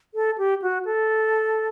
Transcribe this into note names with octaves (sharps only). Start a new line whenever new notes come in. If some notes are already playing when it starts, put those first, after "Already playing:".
A4
G4
F#4
A4